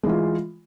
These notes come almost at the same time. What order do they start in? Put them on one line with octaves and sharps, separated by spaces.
G#3 E3 F4